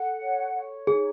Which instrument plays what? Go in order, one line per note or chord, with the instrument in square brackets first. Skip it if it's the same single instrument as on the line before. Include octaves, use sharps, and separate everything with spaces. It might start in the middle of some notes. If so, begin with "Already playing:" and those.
Already playing: [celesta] A4 [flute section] F#5
[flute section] C#5
C#5
[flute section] D#4 [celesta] G#4